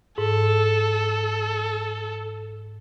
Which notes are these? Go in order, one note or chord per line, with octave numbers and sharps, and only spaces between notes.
G#2 A4